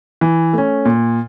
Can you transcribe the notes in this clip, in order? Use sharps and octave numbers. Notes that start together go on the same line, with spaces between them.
E3
A3 C#4
A#2